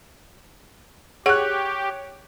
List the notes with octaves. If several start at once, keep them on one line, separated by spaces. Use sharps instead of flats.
G4 G#4 C#5 F#5 F#6